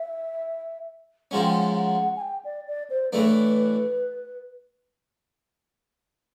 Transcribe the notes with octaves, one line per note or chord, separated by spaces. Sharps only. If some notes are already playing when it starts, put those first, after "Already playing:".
Already playing: E5
G#2 F3 G#3 C#4 F#5
G5
F#5
F#5
G#5
G5
D5
D5
C5
A2 E3 A3 D4 B4